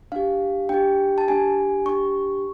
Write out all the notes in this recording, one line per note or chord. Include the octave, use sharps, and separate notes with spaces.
D4 G4 F5
D4 G4 G5
A5
D4 G4 G#5
D4 G4 C#6